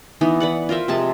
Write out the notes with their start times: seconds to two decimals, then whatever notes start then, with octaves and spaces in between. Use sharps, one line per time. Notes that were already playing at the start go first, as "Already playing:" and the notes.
0.21 E3 B3 D#4
0.40 B4 D5 F#5
0.69 F4 A#4 C5 E5
0.88 C3 F3 G#3 A5